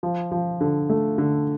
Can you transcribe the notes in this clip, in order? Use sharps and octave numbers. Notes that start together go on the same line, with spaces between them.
F3
F3
D3
A3
D3